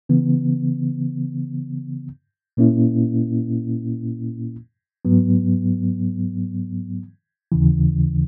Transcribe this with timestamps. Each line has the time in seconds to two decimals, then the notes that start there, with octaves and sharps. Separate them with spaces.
0.09 C#3 E3 B3
2.57 A#2 A#3 C#4 E4
5.05 G#2 F#3 B3
7.52 D#2 C#3 E3